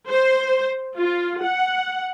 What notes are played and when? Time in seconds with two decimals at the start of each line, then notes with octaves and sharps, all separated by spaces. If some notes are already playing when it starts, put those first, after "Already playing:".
0.11 C5
0.99 F4
1.44 F#5